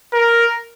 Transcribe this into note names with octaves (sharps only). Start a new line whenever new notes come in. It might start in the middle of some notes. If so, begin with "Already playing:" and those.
A#4